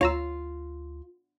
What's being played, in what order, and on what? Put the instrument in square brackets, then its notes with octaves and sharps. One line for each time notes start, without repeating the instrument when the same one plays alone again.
[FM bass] D2 [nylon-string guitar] F4 [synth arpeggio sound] C#5 A#5 E6